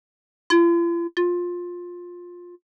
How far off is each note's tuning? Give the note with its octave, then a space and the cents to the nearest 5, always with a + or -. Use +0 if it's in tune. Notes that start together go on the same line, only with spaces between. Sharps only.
F4 -45
F4 +15